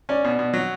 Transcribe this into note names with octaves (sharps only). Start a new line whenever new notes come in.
C#4 D5
B2
B2
F#3